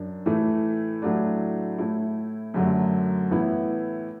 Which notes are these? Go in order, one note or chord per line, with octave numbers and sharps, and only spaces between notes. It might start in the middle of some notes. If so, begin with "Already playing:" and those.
Already playing: F#2 D4
A2 E3 A3
A2 F#3 A3 D4
A2 A3 E4
F#2 D3 F#3 A3
A2 E3 B3 E4